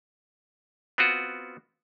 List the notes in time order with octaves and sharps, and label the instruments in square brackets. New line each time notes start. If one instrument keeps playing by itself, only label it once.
[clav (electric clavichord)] B3 C4 F4 F#4